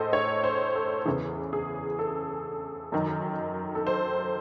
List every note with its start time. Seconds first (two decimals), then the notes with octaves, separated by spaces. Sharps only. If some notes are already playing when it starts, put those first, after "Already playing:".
Already playing: A2 G#4 A4 C5 D#5
0.13 C#5
0.44 C5
0.76 A4
1.05 E2 C#3 E3 G#4
1.53 G#4
1.99 A4
2.92 F#2 D#3
3.75 A4
3.87 C5